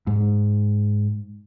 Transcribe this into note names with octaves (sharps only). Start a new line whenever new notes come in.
G#2